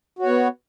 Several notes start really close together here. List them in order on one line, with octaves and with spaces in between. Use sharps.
F#4 C#5 B3